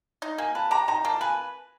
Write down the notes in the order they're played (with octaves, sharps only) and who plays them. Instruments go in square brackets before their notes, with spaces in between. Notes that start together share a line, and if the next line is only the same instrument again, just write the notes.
[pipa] D#4
[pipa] A#3 [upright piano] G#5
[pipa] B4 [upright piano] A5
[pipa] G4 [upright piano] A#5
[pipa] D#4 [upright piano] A#5
[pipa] A#3 [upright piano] A5
[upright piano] A5
[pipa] B4 [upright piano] G#5